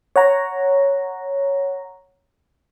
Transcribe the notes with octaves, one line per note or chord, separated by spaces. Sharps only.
C#5 F#5 A#5